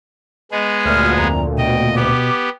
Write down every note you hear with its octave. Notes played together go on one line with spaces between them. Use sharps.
G#3 B3 G#4 D#5
D2 A#2 F6
F2 A#5
B2 D#5 G5
B3 G4 D6